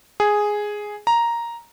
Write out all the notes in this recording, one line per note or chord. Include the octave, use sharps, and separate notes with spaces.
G#4
A#5